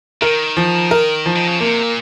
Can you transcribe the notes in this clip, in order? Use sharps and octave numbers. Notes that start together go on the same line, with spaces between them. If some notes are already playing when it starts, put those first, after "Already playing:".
D#3 A#4
F3
A#4
F3
D#3
C#3
C3 A#3
A#2